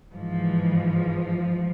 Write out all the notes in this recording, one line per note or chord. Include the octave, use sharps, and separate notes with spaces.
G#2 E3 F3